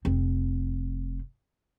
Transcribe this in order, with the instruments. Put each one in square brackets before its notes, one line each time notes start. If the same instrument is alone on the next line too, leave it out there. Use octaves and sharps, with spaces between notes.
[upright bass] F1 C4